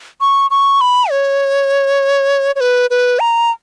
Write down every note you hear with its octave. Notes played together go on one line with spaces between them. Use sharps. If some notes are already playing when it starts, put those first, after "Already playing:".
C#6
C#6
B5
C#5
C#5
B4
B4
A#5